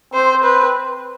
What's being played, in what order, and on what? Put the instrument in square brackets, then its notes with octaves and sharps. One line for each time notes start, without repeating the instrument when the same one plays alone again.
[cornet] C4 [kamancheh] C5
[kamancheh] B4